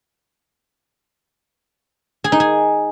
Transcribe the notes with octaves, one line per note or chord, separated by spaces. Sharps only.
G#4
D#4
G#4